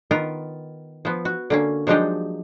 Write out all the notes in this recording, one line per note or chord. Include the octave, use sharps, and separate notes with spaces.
D#3 B3 F4 A#4
F3 B3
F#4
D3 A#3 C#4
F3 F#3 G#3 D4 D#4 G4